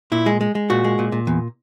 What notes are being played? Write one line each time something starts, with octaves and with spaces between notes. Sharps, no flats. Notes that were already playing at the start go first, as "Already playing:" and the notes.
A#2 E4
G#3
G#3
G#3
A#2 F#4
G#3
A#2
A#2
E2